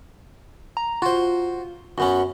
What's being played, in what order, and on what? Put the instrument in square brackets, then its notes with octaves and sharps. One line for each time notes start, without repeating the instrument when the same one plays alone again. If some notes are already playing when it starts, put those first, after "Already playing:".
[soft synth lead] A#5
[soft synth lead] F4 [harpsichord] F#4 C5
[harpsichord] F#2 B3 C#4 [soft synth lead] F#4